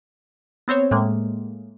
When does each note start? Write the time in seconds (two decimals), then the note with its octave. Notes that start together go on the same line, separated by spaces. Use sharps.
0.68 B3 C4 C5 C#5
0.91 A2 G#3 A#3